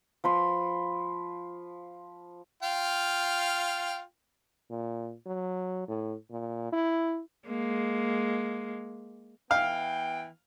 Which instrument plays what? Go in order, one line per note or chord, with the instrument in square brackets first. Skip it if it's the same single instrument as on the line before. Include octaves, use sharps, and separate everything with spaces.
[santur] F3 B5 C6
[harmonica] F4 F5 G5
[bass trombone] A#2
F#3
A2
A#2
E4
[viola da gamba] G#3 A#3
[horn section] E3 B3 G5 [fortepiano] F5